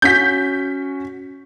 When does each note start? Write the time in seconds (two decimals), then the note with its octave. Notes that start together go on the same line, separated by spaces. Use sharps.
0.02 C#4 F#4 G6 B6